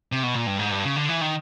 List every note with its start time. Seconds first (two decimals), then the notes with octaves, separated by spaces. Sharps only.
0.12 C3
0.23 B2
0.35 A#2
0.47 G2
0.59 G#2
0.71 G2
0.85 C#3
0.96 D3
1.09 E3
1.21 D#3